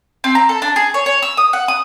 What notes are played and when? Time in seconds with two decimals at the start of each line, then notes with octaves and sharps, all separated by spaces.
0.24 C4
0.35 A#5
0.49 A4
0.62 D4
0.76 G#4
0.94 C#5
1.06 C#5
1.22 E6
1.37 D#6
1.53 F#5
1.68 D#6